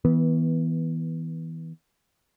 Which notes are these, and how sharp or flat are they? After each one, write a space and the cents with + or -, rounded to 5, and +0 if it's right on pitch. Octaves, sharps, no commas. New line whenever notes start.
E3 -25 B3 -10